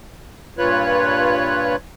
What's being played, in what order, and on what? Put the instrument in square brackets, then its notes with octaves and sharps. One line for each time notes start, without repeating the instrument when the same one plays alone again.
[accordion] G2 A#2 F4 B4 C#5 F#6